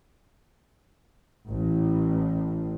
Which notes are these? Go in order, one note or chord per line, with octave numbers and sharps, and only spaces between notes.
A1 A2